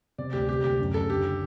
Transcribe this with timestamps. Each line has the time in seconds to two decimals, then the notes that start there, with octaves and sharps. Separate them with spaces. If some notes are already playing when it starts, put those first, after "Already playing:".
0.18 C3 D5
0.33 D2 G4
0.48 C3 G4
0.64 D2 G4
0.79 F#2
0.94 F#1 A4
1.09 D3 G4